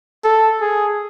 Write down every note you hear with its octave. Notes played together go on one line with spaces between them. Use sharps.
A4
G#4